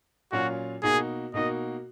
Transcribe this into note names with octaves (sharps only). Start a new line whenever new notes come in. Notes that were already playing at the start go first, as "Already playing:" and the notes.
A#2 F#3 C#4 F4 F#4
B2 A#3 D#4 F#4 G#4
B2 A#3 D#4 F#4 D#5